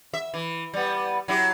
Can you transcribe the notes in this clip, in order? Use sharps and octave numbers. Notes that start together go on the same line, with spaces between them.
E5
E3
G3 B3
F#3 E4 G4